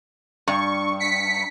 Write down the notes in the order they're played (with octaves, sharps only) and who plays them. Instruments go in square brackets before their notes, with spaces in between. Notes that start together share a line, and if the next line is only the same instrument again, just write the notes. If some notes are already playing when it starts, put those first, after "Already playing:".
[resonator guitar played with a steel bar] G2 [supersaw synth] C#6
[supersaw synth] B6 C#7